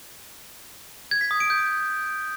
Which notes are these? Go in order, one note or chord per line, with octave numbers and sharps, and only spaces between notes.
G#6
B6
D#6
D7
G6